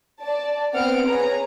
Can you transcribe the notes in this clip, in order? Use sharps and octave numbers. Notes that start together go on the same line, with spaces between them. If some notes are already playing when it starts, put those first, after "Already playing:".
D5 A5
B3 C4 F#5 F6 D7
G#4 B4 C#5 A#5